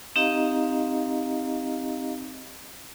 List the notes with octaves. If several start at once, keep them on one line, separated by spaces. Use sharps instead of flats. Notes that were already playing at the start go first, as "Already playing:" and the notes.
C4 D#4 G4 D#5 F5 A#5